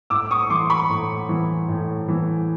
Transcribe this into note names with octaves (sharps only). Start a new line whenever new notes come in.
A2 D6 E6
C#6 D#6
E3 C6 D6
B5 C#6
A2
E3
A2
E3